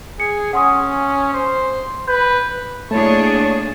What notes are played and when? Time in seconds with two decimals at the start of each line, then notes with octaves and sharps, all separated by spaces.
0.20 G#4 C#7
0.53 C#4 F#5 C6 D#6
1.33 C5
2.08 B4 G6
2.91 A3 A#3 D4 E4 G#4 C#5 A5